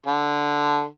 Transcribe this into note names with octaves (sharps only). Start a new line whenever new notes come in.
D3